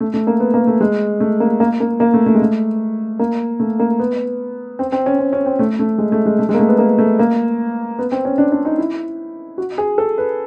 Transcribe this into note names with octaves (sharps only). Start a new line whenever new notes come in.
A3
A3
A#3
B3
A#3
A3
G#3
A3
A#3
A#3
A#3
A#3
A3
A3
G#3
A3
A#3
A3
A#3
B3
C4
C4
C#4
C4
C#4
C4
A3
A3
G#3
A3
G#3
A3
G#3
A#3
A3
B3
A#3
A3
A#3
B3
C4
C#4
D4
D4
D#4
E4
F#4
G#4
A4
B4